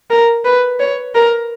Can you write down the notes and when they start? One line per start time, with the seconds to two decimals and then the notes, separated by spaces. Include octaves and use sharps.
0.11 A#4
0.45 B4
0.79 C#5
1.15 A#4